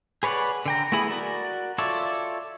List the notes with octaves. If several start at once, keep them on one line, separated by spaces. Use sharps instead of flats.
G#4 B4 C#5 D5 F#5
D3 G5 A#5
A3 B3 E4 G#4 B5
F#4 A#4 D5
F4 A4 C#5 D5 E5